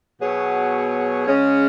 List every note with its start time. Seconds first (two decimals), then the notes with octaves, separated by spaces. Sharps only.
0.20 B2 F#3 B3 G#4 C#5
1.26 C#3 G#3 C#4